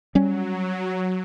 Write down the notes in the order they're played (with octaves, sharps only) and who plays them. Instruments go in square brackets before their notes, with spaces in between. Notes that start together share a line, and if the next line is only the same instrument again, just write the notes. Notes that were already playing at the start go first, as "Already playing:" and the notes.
[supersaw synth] F#3 [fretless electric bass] G3 C#4